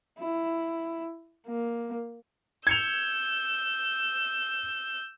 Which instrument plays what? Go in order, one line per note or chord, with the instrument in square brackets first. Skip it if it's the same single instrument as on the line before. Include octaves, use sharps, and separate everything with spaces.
[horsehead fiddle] E4
A#3
[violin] E6 G6 [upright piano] G#6 C#7 F7